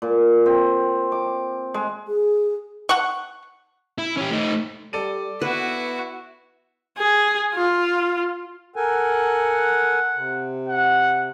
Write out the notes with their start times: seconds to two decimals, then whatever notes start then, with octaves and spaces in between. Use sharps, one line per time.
0.02 A#2
0.46 C4
1.12 D6
1.74 G#3
2.08 G#4
2.89 F#5 C#6
3.98 E4
4.17 C#4 G4
4.30 A3 D#4
4.93 G3 A4 D5 D#7
5.41 B3 E4 F#4 B4
6.98 G#4
7.54 F4
8.76 A4 A#4 F#5 G#5
10.15 C3
10.68 F#5